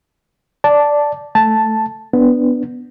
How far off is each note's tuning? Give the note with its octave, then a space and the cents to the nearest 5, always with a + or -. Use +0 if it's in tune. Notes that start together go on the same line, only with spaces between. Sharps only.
D5 -5 A5 +0
A3 +0 A5 +0
B3 +0 D4 -5